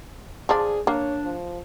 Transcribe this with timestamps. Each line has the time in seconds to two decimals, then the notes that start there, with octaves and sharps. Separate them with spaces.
0.49 F3 D4 G#4
0.87 A#3 D4 C#5
1.24 F3